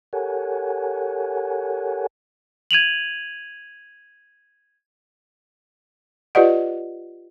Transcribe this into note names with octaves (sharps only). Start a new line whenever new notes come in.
G4 A4 A#4 C#5 F#5 G#5
G#6 D#7 F7 F#7
F4 G4 B4 D5 D#5 F#5